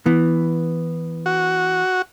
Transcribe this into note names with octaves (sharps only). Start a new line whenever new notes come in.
E3 B3
F#4